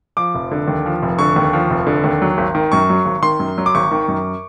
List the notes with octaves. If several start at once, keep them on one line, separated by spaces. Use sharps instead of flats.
F3 D6
F1
D3
D#2
F3
F1
D3 C#6
D#2
F3
F1
D3
D#2
F#3
G#1
D#3
F#2 C#6
F#3
G#1
D#3 C6
F#2
F#3
D6
G#1 C#6
D#3
F#2